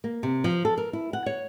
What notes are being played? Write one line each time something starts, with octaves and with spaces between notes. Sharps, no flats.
A#3
C3
F3
A4
A#4
E4
F#5
C#5